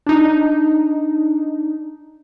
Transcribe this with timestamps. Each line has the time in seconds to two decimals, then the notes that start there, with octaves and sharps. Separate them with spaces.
0.07 D4 D#4